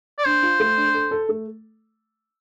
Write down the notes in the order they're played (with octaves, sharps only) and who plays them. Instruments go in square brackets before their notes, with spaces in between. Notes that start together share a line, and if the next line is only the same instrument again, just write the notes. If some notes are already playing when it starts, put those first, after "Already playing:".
[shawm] D5
[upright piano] D4 [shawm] C5
[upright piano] F4
A3
D4
A4
A4
A3